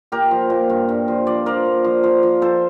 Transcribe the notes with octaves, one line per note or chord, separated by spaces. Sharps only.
A#2 G4 A#4
F3
A#2
G2
G2
F3
F3 D5
F3 A#4 D5
A#2
F3
F3
F3
F3 A4 C5